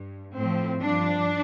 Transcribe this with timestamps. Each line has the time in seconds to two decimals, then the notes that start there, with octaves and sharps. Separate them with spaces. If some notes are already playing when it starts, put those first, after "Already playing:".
Already playing: G2
0.34 A2 F3 C4
0.81 G2 F3 D4